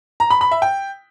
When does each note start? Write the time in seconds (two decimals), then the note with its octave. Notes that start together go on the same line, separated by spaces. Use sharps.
0.20 A#5
0.30 B5
0.41 B5
0.51 E5
0.62 G5